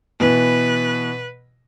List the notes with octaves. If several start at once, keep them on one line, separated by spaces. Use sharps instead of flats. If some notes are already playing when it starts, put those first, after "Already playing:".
B2 E3 B4